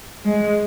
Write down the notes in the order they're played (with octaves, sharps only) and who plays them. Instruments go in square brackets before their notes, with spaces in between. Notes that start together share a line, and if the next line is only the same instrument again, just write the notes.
[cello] G#3